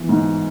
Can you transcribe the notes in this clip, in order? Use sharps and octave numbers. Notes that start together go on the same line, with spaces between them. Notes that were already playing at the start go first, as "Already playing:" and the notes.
Already playing: E3 B3
G#2